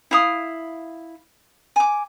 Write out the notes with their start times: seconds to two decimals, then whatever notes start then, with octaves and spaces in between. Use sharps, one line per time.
0.11 E4 F5 D#6
1.76 G#5 D6